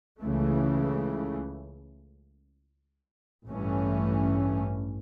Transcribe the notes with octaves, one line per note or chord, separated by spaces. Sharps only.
C#2 C#3 E3 A3
A1 G2 E3 A3 C#4